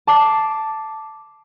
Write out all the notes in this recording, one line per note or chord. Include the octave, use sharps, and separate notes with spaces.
A5 D6 C7